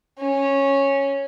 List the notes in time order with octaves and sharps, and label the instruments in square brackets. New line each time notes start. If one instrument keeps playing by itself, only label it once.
[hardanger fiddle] C#4